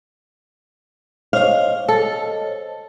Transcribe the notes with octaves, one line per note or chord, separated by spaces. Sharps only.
C5 C#5 D#5 F5
A4